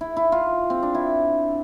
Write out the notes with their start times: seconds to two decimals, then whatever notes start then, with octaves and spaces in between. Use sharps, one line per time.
0.01 E4
0.17 E4
0.32 F4
0.70 C4
0.83 D4
0.95 E4